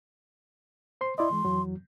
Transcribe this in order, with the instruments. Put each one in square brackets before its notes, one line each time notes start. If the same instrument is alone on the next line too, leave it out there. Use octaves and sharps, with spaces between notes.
[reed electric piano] C5 C6
[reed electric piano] E4 D5 D#5 [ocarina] C6
[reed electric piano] E3 G#3
F2 E3 F#3